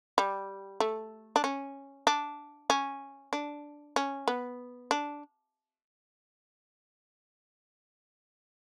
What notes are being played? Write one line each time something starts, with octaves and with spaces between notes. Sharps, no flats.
G3
A3
D4
C#4
D4
C#4
D4
C#4
B3
D4